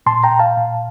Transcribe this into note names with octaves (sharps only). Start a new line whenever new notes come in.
A#2 A5 C6
G5 A#5
A#2
F5 A5
A#2